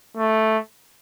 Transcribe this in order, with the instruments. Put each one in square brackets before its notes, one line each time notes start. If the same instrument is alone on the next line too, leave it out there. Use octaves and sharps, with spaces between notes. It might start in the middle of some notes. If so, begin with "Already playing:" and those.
[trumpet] A3